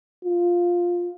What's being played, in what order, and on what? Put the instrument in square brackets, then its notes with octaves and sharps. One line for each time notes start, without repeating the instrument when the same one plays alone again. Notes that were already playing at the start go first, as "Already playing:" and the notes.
[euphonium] F4